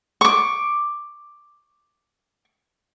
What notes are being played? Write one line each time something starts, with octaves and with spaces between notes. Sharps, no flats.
C#6 D6